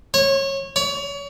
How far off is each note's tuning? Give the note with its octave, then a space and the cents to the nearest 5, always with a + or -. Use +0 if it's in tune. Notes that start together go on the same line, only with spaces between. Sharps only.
C#5 -20
C#5 +35